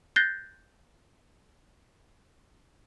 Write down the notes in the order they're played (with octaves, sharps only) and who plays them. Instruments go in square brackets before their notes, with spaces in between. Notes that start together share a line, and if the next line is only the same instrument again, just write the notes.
[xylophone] F#6 G6 A6 A#6 C7 G7